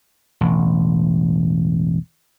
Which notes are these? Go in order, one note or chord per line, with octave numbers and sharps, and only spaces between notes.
E1 A1